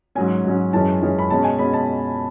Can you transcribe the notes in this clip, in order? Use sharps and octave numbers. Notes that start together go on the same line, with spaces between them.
G#2 F#3 C#4 G#5
G#2 F#3 C#4
F#2 E3 G#3 C#4 A5
F#2 E3 G#3 C#4
B5
B2 G#3 C#4 A5
G#5
B2 G#3 C#4 B5
A5